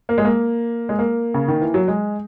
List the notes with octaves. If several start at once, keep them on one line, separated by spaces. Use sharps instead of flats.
A#3
G#3
A#3
G#3
A#3
C#3
D#3
E3
F#3
G#3